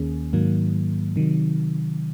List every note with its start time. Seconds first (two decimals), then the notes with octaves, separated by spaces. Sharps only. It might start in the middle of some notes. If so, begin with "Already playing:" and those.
Already playing: D#2 D#3 A#3 C#4 G#4
0.33 G#2 D#3 F#3 A#3
1.16 C3 D#3 F#3